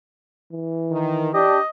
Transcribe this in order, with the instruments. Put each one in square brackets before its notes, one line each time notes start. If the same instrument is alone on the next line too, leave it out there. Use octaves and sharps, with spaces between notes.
[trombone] E3
[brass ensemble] D#3
[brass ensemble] D4 [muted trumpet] G4 [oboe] D#5